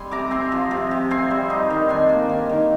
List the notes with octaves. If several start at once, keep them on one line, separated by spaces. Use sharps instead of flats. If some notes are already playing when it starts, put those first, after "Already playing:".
Already playing: G3 C4 G#5 C6
C3 A#5 D6
C4 G#5 C6
F3
C3
C3
C4 G#5 C6
G3
D#4
D#3
D4 G#5 C6
A#3
D#3
D#3